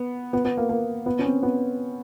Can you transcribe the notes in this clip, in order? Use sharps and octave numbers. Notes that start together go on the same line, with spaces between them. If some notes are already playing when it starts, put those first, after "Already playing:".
Already playing: B3
B3
B3
A#3
A#3
B3
C#4
C4
B3